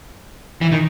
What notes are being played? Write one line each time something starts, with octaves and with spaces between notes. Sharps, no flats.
E3
D#3